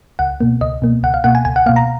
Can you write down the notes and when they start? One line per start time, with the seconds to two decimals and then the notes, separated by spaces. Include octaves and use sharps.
0.19 C#2 F#5
0.41 B2 A#3
0.61 C#2 D#5
0.82 B2 A#3
1.03 C#2 F#5
1.14 F5
1.24 B2 A#3 F#5
1.35 G#5
1.45 C#2 G#5
1.56 F#5
1.66 A#3 F5
1.69 B2
1.76 A#5